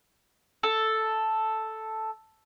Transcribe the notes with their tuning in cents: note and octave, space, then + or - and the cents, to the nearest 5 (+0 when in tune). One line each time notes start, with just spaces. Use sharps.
A4 +0